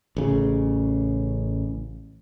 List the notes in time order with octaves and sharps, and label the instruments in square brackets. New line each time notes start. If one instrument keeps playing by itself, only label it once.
[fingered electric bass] A1 C#3